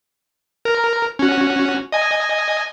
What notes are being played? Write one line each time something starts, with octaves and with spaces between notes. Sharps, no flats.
A#4
C#4 F#4
D#5 G#5